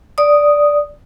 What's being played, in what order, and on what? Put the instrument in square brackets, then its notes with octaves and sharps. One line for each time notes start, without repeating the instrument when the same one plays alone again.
[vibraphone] D5 D#6